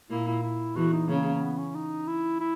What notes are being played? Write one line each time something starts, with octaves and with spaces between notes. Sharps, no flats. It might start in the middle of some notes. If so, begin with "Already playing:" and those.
A#2 A#3 E4
E4
E4
E2 E3 F#4
D#4
C#3 A#3
B3
C#4
D#4
E4
E4